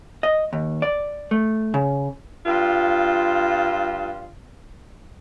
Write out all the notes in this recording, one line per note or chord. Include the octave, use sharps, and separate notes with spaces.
D#5
D#2
D5
A3
C#3
G2 F4